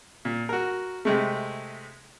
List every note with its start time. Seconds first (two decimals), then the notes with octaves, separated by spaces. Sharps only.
0.25 A#2
0.49 F#4 A#4
1.05 C3 G#3 A3